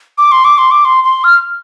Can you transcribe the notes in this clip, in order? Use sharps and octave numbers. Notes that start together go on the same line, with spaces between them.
D6
C6
D6
C6
D6
C6
C6
F6